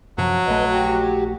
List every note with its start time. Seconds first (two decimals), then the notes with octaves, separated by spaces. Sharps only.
0.18 F#2 C3 F3 F#3
0.47 A#1 A3 B4 D#5
0.71 F#4 G4